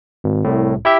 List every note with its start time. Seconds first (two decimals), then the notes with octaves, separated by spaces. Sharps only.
0.24 G#1
0.44 C2 A2
0.85 E4 G4 E5